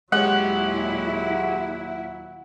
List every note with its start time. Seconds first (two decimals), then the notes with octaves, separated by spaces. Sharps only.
0.12 D#2 A#2 F#3 G#3 E4 G4 C#5 F#5